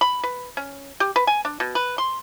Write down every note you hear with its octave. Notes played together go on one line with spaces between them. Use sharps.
B5
B4
C#4
G4
B4
G#5
D4
B2
B4
C6